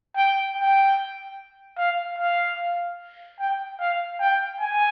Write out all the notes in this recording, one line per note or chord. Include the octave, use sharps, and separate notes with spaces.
G5
G5
F5
F5
G5
F5
G5
G#5